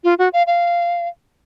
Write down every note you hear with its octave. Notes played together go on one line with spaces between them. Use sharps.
F4
F#4
F5
F5